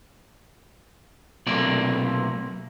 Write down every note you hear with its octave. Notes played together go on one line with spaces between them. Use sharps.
B1 C3 A3 A#3 D5